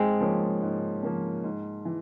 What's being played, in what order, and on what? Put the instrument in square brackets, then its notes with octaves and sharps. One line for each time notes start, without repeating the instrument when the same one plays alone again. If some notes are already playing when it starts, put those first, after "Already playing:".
Already playing: [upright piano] G#2 [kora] G#3 C4
[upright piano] F3 A#3 C#4
G#2
F3 A#3 C#4
G#2
E3